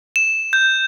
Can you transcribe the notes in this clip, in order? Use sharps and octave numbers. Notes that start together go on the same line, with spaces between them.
E7
G6